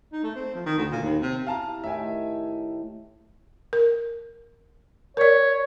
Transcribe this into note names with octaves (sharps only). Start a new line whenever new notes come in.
D#4
A3
C4
F3
D#3
D2
A#2
D#2
C3
E4 G4 F5 A5 A#5
A2 D#3 E5 G5 G#5
A#4
A#4 C#5 D5